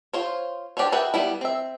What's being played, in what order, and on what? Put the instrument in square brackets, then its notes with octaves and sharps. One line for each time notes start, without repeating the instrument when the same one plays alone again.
[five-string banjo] F4 C5 C#5
D4 G4 G#4 C5 C#5
F#4 G#4 B4 E5 G5
G3 B3 E4
C4 E5